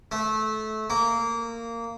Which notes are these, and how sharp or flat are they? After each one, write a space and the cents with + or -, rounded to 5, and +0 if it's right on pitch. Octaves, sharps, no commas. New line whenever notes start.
A3 -20
A#3 -15